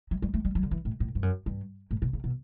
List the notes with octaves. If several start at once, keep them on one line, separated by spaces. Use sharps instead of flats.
F#3
G3
A3
G3
F#3
D3
E3
A2
A2
G2
F#2
G2
A2
B2
C#3
B2